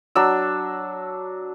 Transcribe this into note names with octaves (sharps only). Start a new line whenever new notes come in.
F#3 D4 E6